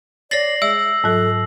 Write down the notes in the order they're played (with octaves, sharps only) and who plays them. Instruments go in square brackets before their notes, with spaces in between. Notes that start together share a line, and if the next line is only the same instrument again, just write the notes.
[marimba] C#5 A6 [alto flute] D5 [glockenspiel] A#6 C7 F#7
[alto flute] G#3 [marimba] E5 [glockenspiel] E6
[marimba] G#2 F#3 [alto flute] A4